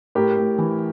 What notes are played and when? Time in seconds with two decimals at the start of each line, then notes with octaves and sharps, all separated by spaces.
0.15 A2 G4 A#4
0.37 A2
0.58 E3